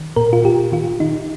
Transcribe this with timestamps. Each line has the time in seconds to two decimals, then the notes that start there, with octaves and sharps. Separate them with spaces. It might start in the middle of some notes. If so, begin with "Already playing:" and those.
Already playing: D#3
0.16 A#2 A#4
0.33 F4
0.45 A#2 G4
0.72 D#3 F4
1.00 D#3 D#4